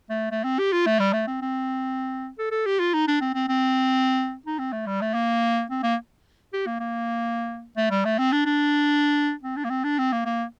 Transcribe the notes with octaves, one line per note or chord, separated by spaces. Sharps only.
A3
A3
C4
G4
F4
A3
G3
A3
C4
C4
A4
A4
G4
F4
D#4
D4
C4
C4
C4
D#4
C4
A3
G3
A3
A#3
C4
A#3
G4
A#3
A#3
A3
G3
A3
C4
D4
D4
C4
D4
A#3
C4
D4
C4
A#3
A#3